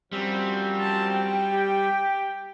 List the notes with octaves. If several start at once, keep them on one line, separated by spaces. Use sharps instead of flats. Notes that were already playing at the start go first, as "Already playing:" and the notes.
F#2 F3 G3 C4
A5
G5
G4